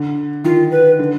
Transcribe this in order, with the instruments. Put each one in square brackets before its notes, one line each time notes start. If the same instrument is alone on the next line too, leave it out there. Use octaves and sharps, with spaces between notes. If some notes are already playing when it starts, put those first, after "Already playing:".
Already playing: [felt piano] D3
[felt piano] D#3 [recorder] F4
[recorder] B4
[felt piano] D3